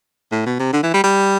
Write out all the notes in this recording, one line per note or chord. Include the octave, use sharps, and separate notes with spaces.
A2
B2
C3
D3
E3
G3
G3